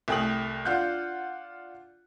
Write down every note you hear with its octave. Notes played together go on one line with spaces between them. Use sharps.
C2 A3 G5 D#6 F#7
D4 F4 F#5 F#6 G6